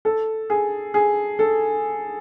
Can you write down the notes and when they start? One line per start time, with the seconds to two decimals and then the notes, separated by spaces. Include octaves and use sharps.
0.05 A4
0.50 G#4
0.94 G#4
1.39 A4